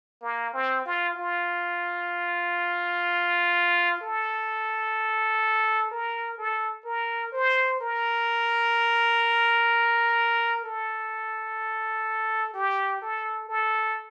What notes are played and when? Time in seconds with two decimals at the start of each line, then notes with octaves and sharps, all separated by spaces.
0.22 A#3
0.53 C4
0.86 F4
1.16 F4
4.01 A4
5.91 A#4
6.38 A4
6.85 A#4
7.32 C5
7.81 A#4
10.64 A4
12.54 G4
13.02 A4
13.49 A4